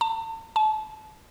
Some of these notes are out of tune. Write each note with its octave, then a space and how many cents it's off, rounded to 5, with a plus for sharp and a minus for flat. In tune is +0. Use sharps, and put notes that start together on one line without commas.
A5 +40
A5 -30